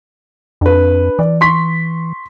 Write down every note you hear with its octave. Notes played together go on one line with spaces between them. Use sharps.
F2 D4 B4
E3 D5
C6 C#6 B6